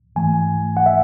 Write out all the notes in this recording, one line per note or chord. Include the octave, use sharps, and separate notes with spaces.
G#2 E3 A3 G#5
F#5
E5